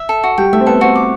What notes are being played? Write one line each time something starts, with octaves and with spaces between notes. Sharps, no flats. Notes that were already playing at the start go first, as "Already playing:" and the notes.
Already playing: E5
A4
F#4
G3 G5
A3 E5
C4
B3 A4
C4 F#4
D6